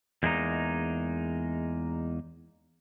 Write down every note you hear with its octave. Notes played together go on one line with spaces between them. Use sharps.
E2 G#3 A#3 D4 D#4